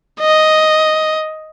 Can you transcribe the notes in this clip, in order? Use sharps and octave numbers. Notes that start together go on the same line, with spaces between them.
D#5